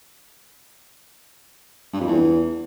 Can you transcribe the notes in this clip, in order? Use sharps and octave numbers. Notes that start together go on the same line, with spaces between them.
G2
F2
E2